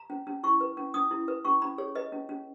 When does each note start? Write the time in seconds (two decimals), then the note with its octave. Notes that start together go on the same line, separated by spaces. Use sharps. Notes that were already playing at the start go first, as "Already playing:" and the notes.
Already playing: A#5
0.10 C#4
0.27 C#4
0.43 E4 C#6
0.61 B4
0.77 C#4
0.94 C#4 D#6
1.11 E4
1.28 B4
1.45 C#4 C#6
1.62 C#4 B5
1.78 G#4 C#5
1.95 B4 D#5
2.12 C#4
2.29 C#4